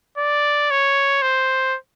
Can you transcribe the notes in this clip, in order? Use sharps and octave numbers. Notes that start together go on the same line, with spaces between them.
D5
C#5
C5